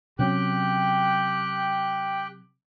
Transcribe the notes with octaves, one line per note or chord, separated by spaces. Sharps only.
C3 F#3 C#4 G4 G5 F#6